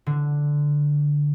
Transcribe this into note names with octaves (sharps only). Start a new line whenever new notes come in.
D3